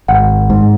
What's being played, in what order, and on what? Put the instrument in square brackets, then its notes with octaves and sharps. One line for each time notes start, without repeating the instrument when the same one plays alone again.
[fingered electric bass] G#1 [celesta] F#5
[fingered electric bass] G#2